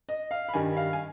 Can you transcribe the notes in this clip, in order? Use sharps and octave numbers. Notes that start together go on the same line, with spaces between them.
D#5
F5
B5
G2 D#3 G3 G#5
F5
G#5